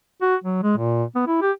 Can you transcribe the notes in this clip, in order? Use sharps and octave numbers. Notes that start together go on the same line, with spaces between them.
F#4
F#3
G#3
A#2
B3
E4
G4